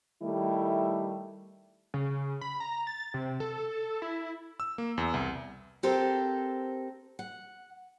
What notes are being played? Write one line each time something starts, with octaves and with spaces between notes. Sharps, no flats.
D#3 G3 A3 E4
C#3
B5
A#5
A6
C3
A4
E4
E6
A#3
E2
C2
C4 G4 A4 A#4 C5
F#5